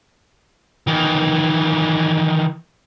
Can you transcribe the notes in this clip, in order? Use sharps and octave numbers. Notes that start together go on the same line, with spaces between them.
D#3 E3